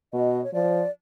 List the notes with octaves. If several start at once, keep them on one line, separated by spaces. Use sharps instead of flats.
B2 D#5
C#5
F3 D5